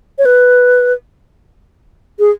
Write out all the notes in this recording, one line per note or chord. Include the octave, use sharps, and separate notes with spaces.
C#5
B4
G#4